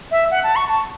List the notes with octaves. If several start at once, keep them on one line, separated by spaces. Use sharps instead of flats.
E5
F#5
A5
C#6
A5